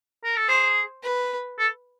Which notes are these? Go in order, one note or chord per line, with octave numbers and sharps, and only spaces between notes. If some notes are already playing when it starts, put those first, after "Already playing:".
A#4
A4
G#4 C5
B4
A4